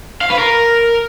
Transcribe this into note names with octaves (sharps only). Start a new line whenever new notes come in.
F5
B4
A#4